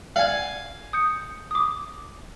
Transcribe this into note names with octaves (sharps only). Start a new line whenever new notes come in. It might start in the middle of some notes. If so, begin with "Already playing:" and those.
D5 F5 F#5 G#5 F#7
D#6 G6 C#7
D6 D#6